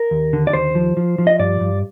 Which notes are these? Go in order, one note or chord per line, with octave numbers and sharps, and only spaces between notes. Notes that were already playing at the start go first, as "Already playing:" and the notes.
Already playing: A#4
D#2
D3
D5
D#2 C5
F3
F3
F3
D#5
G2 D5
G2